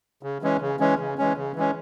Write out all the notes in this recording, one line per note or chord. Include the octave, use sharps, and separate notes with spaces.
C#3
E3 G#3 C#4
C#3
E3 G#3 C#4
C#3
E3 G#3 C#4
C#3
E3 G#3 C#4